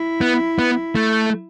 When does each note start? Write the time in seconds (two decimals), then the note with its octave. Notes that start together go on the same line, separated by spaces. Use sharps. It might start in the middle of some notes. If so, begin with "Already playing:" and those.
Already playing: E4
0.21 B3
0.59 B3
0.96 A3